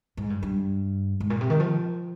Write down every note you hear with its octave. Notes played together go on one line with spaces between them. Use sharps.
G#2
G2
G2
G#2
A#2
C3
D#3
F3